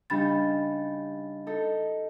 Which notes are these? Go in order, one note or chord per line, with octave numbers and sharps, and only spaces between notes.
C#3 G3 D4 D#4 B5 A6
D#4 A4